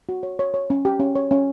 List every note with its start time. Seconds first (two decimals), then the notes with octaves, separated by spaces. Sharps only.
0.09 F#4
0.23 C#5
0.39 C#5
0.54 C#5
0.70 C#4
0.85 G4
1.00 C#4
1.15 C#5
1.31 C#4